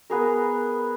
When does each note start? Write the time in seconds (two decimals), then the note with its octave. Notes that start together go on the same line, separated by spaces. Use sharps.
0.10 B3 G#4 A#4